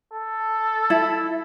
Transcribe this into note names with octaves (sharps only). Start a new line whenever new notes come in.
A4
E4